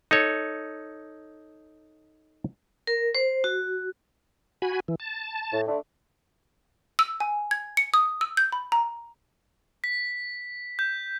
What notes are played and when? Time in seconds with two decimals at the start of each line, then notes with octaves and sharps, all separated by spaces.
0.11 D#4 A4 C#5
2.87 A#4
3.15 C5
3.44 F#4
4.62 F#4 G#5 B5
4.88 E3
5.00 A5
5.52 A2
5.68 D3 A3 D4
6.99 E6
7.20 G#5
7.51 G#6
7.77 C#7
7.94 D#6
8.21 E6
8.37 G6
8.52 B5
8.72 A#5
9.84 B6
10.79 G6